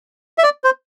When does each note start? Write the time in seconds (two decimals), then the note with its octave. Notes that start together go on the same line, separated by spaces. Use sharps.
0.38 E5
0.43 D5
0.64 C5